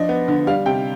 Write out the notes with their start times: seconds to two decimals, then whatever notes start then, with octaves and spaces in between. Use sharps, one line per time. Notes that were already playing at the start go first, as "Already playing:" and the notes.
Already playing: F3 D4 D#5
0.09 B3
0.28 D3
0.47 G3 F5
0.66 C3 G5